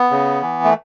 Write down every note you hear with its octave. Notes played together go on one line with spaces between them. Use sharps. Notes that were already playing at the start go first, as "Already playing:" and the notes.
Already playing: B3
C#3
E3
A3